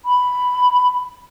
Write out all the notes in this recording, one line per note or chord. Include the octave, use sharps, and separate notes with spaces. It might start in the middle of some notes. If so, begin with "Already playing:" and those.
B5